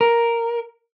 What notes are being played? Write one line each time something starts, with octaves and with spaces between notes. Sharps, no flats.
A#4